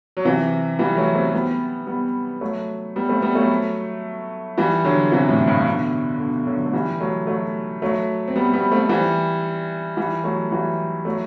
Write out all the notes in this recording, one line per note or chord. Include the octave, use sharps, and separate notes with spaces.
F#3
C3 E3
E3 G3
F#3 A3
A3 C4
G3 B3
G3 B3
F#3 A3
G3 B3
A3 C4
G3 B3
F#3 A3
E3 G3
D3 F#3
C3 E3
A2 C3
G2 B2
B2 D3
B2 D3
D3 F#3
A3
E3 G3
F#3 A3
F#3 A3
F#3 A3
C4
G3 B3
G3 B3
A3 C4
E3 G3
E3 G3
F#3 A3
E3 G3
F#3 A3